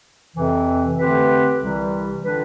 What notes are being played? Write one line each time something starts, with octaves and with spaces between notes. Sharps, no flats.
F2 C3 E3
D3 A3 C4 G4 B4
C2 C3 E3 G3
D3 G3 D4 F4 B4